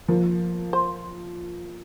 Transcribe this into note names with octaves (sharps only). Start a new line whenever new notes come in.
F3 A#3
C5